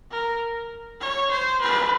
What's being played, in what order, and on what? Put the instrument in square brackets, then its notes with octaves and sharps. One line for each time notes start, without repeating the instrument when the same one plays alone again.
[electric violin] A#4
C#5
C5
B4